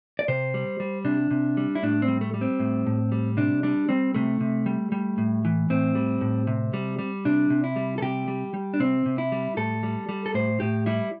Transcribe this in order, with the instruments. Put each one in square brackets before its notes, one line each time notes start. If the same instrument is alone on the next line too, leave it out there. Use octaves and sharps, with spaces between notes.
[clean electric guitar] D5
C3 C5
G3
G3
C3 D4
C3
G3
E4
A2 D4
C4
G3
A3
G3
C4
A2
A2
G3
C3 D4
G3 D4
G3 C4
C3 A3
C3
G3
G3
A2
E3
A2 C4
G3
A2
C3
G3
G3
C3 D4
C3
E4
G3
A4
C3 G4
G3
G3
D4
C3 C4
C3
E4
G3
A2 A4
G3
G3
A4
A2 C5
A2 G4
G3 E4